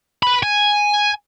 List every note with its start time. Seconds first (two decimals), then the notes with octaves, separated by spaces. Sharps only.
0.23 B4 B5
0.43 G#5